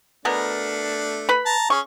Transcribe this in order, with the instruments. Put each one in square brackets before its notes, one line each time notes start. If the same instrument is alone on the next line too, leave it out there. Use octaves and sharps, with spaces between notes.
[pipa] B2 B3 A#4 [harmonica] A3 D4
[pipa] B4 B5
[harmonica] A5 A#5
[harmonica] C#4 G#4 [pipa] C#6